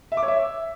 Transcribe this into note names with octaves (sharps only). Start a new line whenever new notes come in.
E5
D6
C#5
E5